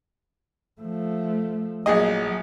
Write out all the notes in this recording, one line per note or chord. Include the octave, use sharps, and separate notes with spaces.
F3 A3
A#1 F#3 G#4 D#5